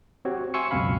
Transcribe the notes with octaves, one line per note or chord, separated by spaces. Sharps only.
C4 F#4 G4 C#5
E5 G#5 C6 C#6 E6 C#7
C#2 F#2 B2 C4 F5 B5